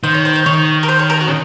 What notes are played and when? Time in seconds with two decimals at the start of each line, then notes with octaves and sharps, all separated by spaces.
0.04 D#3 C5
0.14 C#5
0.25 C5
0.35 C5
0.46 D#3 C#5
0.83 A#4
0.88 C5
0.99 C#5
1.10 A#4
1.21 F#4
1.27 C#4